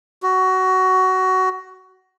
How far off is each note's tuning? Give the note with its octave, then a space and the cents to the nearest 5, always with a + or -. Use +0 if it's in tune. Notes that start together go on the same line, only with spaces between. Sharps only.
F#4 +15